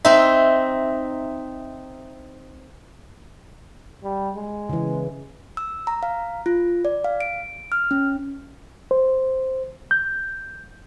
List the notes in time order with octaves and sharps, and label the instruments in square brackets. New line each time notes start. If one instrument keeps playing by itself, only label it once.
[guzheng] C4 D#4 [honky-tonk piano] E5
[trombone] G3
G#3
[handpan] C#3 E3
[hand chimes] E6
A#5
F5
F4
D5
F5
D7
F6
C#4
[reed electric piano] C5
G6